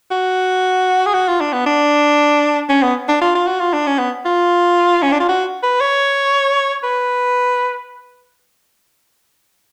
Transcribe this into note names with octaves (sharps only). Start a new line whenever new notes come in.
F#4
G#4
F#4
F4
D4
B3
D4
C#4
B3
D4
F4
F4
F#4
F4
D4
C#4
B3
F4
C#4
D4
F4
F#4
B4
C#5
B4